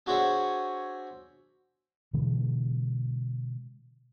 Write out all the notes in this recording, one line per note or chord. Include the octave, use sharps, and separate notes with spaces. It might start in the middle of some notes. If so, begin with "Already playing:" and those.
D4 F#4 G#4 C5 C#5 E5
B2 D3 E3 G#3